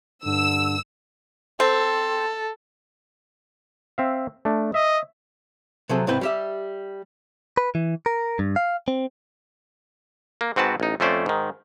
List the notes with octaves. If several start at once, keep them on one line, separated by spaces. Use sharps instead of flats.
G2 D3 E6
C4 A4
C4 E5 F5
A3 D4
D#5 E5
C3 F#3 C4 G#4 A4
C2 G#2 C4 E4 B4 G5
G3 G4 E5
B4
E3
A#4
G2
F5
C4
A#3
G#2 C4 F#4 B4 A5
A1 D#4
F2 A3 C#4 C5 D5
G#2 D#3